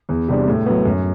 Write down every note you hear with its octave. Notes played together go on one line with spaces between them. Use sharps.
E2
C3 G3 D4
A2
F#3 B3
F#2